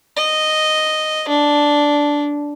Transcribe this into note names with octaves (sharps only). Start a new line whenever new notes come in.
D#5
D4